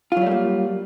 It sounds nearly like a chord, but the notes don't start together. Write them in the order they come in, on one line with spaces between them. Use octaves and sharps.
F4 F#3 G3 A3 A#3